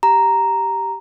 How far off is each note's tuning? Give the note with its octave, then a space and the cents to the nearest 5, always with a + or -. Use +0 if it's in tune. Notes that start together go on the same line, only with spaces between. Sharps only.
G4 -5 A#5 +0